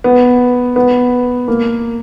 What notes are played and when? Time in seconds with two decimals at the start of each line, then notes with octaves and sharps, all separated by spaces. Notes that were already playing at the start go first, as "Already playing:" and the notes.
0.04 B3
0.76 B3
1.48 A#3